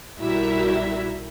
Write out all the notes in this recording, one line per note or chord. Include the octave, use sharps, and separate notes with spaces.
B1 G3 E4 F#4 A#4 E5